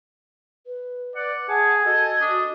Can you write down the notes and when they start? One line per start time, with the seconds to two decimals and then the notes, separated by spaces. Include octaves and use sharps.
0.66 B4
1.16 D5 F#5
1.49 G#4 F#5 G#5 A5
1.86 F#4 A4 D#5
2.21 D4 D#6